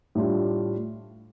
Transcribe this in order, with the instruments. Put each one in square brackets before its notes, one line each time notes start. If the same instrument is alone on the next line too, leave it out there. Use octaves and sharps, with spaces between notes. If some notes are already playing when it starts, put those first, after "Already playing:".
[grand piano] A2 G3 D4 F4